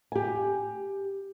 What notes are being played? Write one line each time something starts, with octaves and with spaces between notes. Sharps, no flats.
G4 G#5